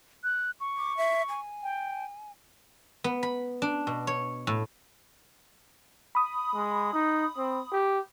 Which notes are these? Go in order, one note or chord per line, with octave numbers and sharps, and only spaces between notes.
F#6
C#6
D6
E5
G#5
G5
B3
B5
D4
B2
C#5
A2
B5 D#6
G#3
D#4
C4
G4